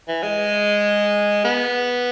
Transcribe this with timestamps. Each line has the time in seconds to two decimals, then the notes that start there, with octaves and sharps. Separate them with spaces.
0.08 E3
0.23 G#3
1.45 B3